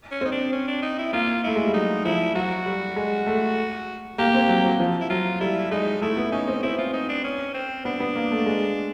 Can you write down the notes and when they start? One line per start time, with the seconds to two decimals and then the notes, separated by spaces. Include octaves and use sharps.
0.11 C#4
0.21 C4
0.25 D#4
0.32 D4
0.52 C#4
0.67 D4
0.82 D#4
0.98 E4
1.13 A#3 F4
1.44 A3 E4
1.56 G#3
1.65 G3
1.74 F#3 D#4
2.05 F3 E4
2.35 F#3 F#4
2.66 G3
2.96 G#3
3.27 A3
4.18 A#3 G4
4.34 C4
4.49 F#3
4.64 F#3
4.80 F3
5.01 E4
5.10 F#3 F4
5.40 G3 E4
5.71 G#3 D#4
6.02 A3 E4
6.17 B3
6.32 C#4 D#4
6.48 C4
6.63 C4 E4
6.78 F4
6.93 D#4
7.09 D4
7.24 C#4
7.54 C4
7.85 B3 D4
8.00 B3
8.16 A#3
8.31 A3
8.46 G#3